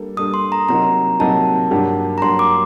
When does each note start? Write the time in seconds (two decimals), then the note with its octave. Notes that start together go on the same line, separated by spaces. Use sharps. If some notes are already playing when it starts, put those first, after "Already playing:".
Already playing: G3 A#3 D4 A4
0.17 G3 A#3 D4 A4 D#6
0.34 C6
0.52 A#5
0.69 C3 F#3 A#3 D#4 A#5
1.20 C3 F#3 A#3 D#4 A5
1.71 G2 F#3 A#3 D4 G4
2.18 A#5
2.22 G2 F#3 A#3 D4 G4 C6
2.39 D6